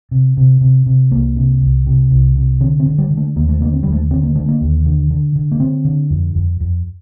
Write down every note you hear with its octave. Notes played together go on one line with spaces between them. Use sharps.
C3
C3
C3
C3
C2 A#3
C3
C2
C3
C2
C3
D3 C4
C4
D3
G3
D3
A3
D#2 A#3
A3
D3 A#3
C4
D#2 G3
A3
D3 C4
A#3
D3 A3
A#3
D#2
D3
D3
D3
A#3
D3 C4
D3
F2
F2
F2